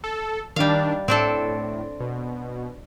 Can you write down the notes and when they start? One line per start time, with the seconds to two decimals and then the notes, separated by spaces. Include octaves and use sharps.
0.04 A4
0.56 D#3 G3 D4 F5
1.08 A2 C4 D4 A4
2.00 B2